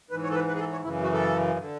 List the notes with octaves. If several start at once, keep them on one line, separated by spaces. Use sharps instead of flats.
G#2 E3 B4
C#5
A4
B4
B4
G#4
A4
C#5
F#2 C#3 E3 E4
F#4
A4
D3